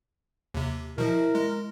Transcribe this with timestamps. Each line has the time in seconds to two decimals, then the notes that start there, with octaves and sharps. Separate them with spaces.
0.54 D#2 C3
0.98 B2 F3 E4 A#4
1.35 G#3